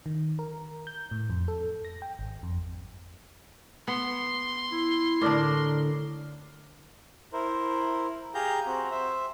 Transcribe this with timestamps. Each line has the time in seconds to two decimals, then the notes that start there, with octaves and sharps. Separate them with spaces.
0.06 D#3
0.39 A#4
0.87 G6
1.11 A2
1.30 F2
1.48 A4
1.85 A#6
2.02 G5
2.19 G#1
2.43 F2
3.88 B3 C6
4.72 E4
5.22 A2 D3 D4 A#4 D5 D6
7.33 E4 A#4 C5
8.34 G4 G#4 F5 A#5 G6
8.66 C4 F#4
8.91 C5 E5